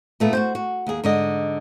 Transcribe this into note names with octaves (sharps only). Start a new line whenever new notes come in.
A#2 A3 B3
F#4 G4 C5
F#4
D#2 G#4
G#2 D3 D#5